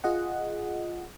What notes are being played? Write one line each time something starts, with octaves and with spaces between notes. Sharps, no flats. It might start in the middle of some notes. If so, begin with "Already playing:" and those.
F4 G#4 D#5 F#5